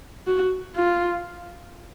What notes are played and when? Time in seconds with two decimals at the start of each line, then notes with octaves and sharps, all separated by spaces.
0.27 F#4
0.76 F4